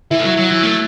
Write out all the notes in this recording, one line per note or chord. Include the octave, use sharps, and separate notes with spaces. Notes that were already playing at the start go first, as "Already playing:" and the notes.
E3 E4 E5
A3
F#3
F#3
E3
A3